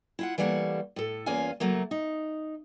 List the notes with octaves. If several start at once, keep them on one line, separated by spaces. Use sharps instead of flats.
E4 F4 F#5
E3 G3 A3 A#3 F#5
A2 A4
E2 A#3 C#4 F4 F5 G#5
C#3 F#3 A3 A#3
D#4